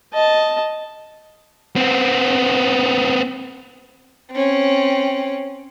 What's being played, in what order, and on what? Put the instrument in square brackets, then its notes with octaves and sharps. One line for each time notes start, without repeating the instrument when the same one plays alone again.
[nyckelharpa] D#5 A5
[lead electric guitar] B3 C4
[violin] C4 C#4